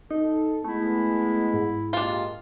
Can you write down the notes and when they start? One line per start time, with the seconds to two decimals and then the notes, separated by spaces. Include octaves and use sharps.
0.11 D#4 A4
0.65 G#3 A3 B3 E4
1.54 G#2
1.93 A#2 D4 F4 G4 D#5